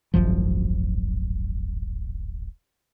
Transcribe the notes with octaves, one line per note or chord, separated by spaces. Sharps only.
D1 G#1 F#2 F3